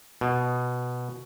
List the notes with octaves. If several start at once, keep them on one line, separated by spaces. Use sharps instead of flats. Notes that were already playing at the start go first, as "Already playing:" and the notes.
B2